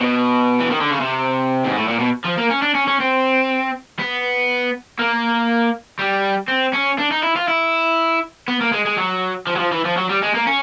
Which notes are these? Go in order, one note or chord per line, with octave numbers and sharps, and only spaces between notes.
B2
E3
D#3
D3
C#3
C3
G#2
A2
A#2
B2
F3
A#3
C#4
D4
C#4
C#4
C4
B3
A#3
G3
C4
C#4
D4
D#4
E4
F4
E4
B3
A#3
G#3
G#3
F#3
F3
F#3
F3
E3
F3
F#3
G3
G#3
A#3
C#4